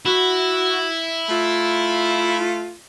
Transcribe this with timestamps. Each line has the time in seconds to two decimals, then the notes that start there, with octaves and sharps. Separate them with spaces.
0.06 E4 F#4
1.29 A3 F4